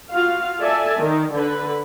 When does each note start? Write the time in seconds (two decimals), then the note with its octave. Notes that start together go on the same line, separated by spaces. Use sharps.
0.11 F4 F#4 F5
0.60 A4 D5 E5 G#5 A5
1.00 D#3
1.32 D3 B4